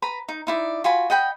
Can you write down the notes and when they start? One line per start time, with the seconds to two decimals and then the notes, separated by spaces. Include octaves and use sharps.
0.02 B4 A#5 B5
0.28 D#4
0.47 D#4 E4 D5
0.84 F4 F#4 G#5 B5
1.10 D#5 F#5 G5 B5